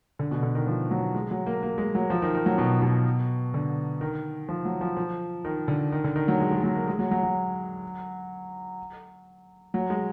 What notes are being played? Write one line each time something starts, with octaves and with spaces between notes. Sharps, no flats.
D3
B2
D3
D#3
F3
F#3
G#3
F#3
A#3
A#3
G#3
F#3
F3
D#3
D#3
F#3
B2
B2
D3
D#3
F3
F#3
F3
F3
D#3
D3
D#3
D3
D#3
F#3
G#3
G#3
F#3
A#3
G#3
F#3
F#3
F#3
F#3
G#3